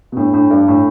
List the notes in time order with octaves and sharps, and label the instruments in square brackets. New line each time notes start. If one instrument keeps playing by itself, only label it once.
[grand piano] B2
[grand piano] A2 [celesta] D4
[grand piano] A2 [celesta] D4
[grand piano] G2 [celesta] A4
[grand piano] A2 [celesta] D4